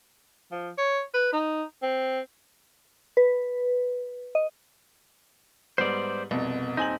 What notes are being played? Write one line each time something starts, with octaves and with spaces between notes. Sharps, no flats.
F3
C#5
B4
D#4
C4
B4
D#5
G#2 G3 B3 C5 D5
C2 F2 B2
D#1 C4 D#4 G#5 F#7